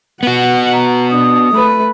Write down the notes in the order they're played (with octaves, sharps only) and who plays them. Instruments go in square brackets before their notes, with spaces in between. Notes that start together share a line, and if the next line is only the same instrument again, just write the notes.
[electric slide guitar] B3 F#4 [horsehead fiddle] F#5
[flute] A#5
[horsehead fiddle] D4 [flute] D#6
[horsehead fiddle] A3 B4